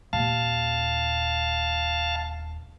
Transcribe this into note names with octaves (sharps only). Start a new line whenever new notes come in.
D#1 F5 A5